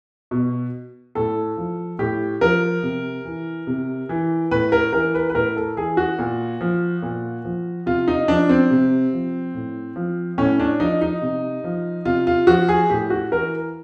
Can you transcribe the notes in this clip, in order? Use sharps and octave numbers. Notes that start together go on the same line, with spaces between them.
B2
A2 A4
F3
A2 G4
F3 A#4
C3
E3
C3
E3
A2 B4
A#4
E3 A#4
B4
B4
A2 A#4
A4
E3 G#4
F#4
A#2
F3
A#2
F3
C3 F4
D#4
F3 D4
C4
C3
F3
A2
F3
A2 C#4
D4
F3 D#4
D#4
C3
F3
C3 F4
F4
F3 F#4
G#4
A2 G4
F#4
E3 A#4